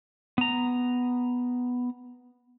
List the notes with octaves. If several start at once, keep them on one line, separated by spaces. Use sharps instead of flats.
B3 A#5